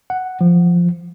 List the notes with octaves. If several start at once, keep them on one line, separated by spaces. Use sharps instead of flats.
F#5
F3